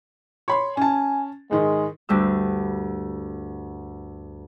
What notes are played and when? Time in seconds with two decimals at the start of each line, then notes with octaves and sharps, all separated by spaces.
0.48 C#5 B5 C6
0.77 C#4 G#5 A5
1.51 G#2 D#3 G#3
2.09 D2 G2 G3 E6